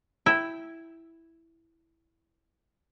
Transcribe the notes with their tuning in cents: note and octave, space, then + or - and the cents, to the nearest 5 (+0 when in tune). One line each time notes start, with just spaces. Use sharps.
E4 +0 G5 +0